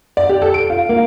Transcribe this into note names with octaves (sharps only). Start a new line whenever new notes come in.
D5
G4
A4
D7
F4
A#3